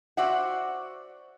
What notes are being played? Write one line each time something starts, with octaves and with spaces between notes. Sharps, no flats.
F#4 C5 D5 E5 F#5